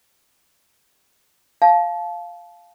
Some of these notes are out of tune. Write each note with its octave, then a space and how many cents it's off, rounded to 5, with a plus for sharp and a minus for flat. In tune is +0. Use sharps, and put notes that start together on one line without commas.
F5 +0 A5 -25